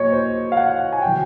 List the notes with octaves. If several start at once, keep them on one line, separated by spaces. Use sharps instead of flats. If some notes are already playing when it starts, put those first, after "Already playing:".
Already playing: A#2 F#3 C#5 D#5
C5
F5
F#5
G#5
D3 F#3 G5